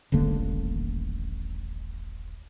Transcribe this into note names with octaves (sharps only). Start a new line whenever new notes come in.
D#1 A1 D3 A#3